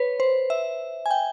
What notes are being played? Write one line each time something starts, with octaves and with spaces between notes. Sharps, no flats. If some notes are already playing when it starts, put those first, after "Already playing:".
Already playing: B4 C#5
C5
E5
G#5
G5